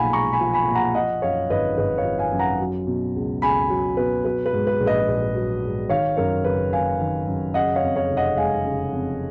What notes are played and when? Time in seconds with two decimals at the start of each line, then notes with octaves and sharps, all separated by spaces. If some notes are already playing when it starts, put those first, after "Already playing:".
Already playing: B1 A#2 F3 F5 F#5 G#5 B5
0.13 G#3 A#5 C#6
0.33 G#5 B5
0.41 F3
0.53 G#5 B5
0.68 A#2
0.75 F#5 A#5
0.95 F3 D#5 F#5
1.22 F#2 C#5 F5
1.50 G#1 B4 D#5
1.78 G#1 B4 D#5
1.98 C#5 F5
2.05 F3
2.19 F5 G#5
2.32 F#2
2.39 F#5 A#5
2.60 F#3
2.87 B2
3.16 C#2
3.42 C#2 G#5 B5
3.70 F#3
3.97 B2 B4
4.25 F#3 B4
4.46 B4
4.53 G#2
4.67 B4
4.80 A#1
4.86 B4 D#5
5.08 A#1
5.35 F#3
5.63 G#2
5.89 D#3 C#5 F5
6.17 F#2 A#4 C#5
6.44 F#1 B4
6.73 F#1 F5 G#5
7.00 D#3
7.27 F#2
7.54 C#3 D#5 F#5
7.75 C#5 F5
7.82 F2
7.96 C#5 F5
8.10 F1
8.17 D#5 F#5
8.37 G#3 F5 G#5
8.65 C#3
8.92 F2